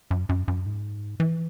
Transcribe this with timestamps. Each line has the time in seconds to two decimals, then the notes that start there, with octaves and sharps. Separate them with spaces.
0.11 F#2
0.29 F#2
0.48 F#2
0.66 G#2
1.20 E3